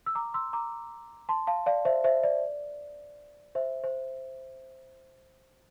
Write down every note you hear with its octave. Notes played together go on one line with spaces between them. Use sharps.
E6
A#5 D6
C6 E6
A#5 D6
A5 C6
F5 A5
D5 F5
C5 E5
C5 E5
D5
C5 E5
C5